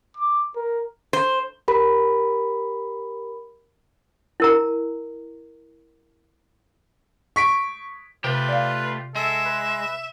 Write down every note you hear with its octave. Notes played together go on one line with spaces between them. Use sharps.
D6
A#4
C5
G4 A#4 B5
E4 A#4 A#5
C#6 B6 D7
C3 A3 F4 G4 B4
D5 F5
G#3 A4 E5
B4